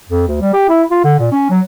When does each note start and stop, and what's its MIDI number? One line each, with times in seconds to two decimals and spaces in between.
0.09 0.26 41
0.28 0.38 38
0.41 0.52 55
0.53 0.65 67
0.69 0.83 64
0.91 0.99 65
1.04 1.17 50
1.19 1.28 46
1.32 1.47 61
1.50 1.60 54